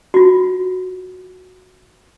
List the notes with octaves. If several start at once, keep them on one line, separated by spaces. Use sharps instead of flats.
F4 F#4